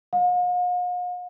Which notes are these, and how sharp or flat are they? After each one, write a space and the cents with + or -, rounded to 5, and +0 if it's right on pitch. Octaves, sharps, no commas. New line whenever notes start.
F5 +45